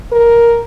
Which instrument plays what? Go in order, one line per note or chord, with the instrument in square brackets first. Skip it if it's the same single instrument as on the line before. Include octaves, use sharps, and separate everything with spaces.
[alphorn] A#4